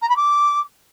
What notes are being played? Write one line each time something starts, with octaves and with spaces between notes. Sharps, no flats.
A#5
B5
D6